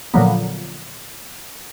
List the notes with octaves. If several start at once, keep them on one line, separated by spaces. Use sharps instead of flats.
A#2 D3 F3 F#3 A#3 B3